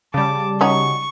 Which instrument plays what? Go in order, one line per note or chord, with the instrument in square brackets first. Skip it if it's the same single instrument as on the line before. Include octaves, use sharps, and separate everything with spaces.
[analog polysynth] C#3 G3 [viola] A5 D6
[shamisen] C#4 D#4 F#4 [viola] C#6